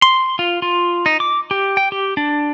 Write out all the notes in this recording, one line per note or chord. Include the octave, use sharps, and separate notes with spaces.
C6
F4
F4
D#4
D6
G4
G5
G4
D4